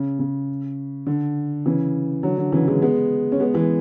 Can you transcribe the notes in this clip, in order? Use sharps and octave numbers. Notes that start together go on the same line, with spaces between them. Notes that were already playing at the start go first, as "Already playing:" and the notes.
Already playing: C#3
C#3
D3
C#3 E3
D3 F#3
D3
C#3 E3
E3 G#3
G#3 B3
C#4
G#3 B3
E3 G#3